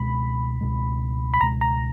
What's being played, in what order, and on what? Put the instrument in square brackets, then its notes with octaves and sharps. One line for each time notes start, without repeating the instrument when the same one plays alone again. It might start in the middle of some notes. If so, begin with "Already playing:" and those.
Already playing: [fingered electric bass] C#2 B2 G#3 [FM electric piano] B5
[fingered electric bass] C#2 B2 G#3
[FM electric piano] B5
[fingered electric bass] C#2 B2 G#3 [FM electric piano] A#5
[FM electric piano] A#5